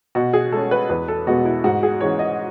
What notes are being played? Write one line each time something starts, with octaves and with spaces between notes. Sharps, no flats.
B2 F#4
G#4
G#3 C#4 A4
B4
E2 B4
A4
B2 G#3 B3 F#4
E4
G#2 F#4
G#4
E3 G#3 C#4 C#5
D#5